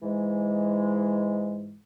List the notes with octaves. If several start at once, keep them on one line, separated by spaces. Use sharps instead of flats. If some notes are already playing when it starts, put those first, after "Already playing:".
G#2 E3 G#3